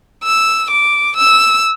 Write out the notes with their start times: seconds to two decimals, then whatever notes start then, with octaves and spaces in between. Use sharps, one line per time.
0.24 E6
0.70 D6
1.17 E6